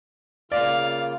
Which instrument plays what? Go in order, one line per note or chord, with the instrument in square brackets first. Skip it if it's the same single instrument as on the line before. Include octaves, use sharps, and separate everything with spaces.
[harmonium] C#3 A#3 F4 [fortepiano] D5 [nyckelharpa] F5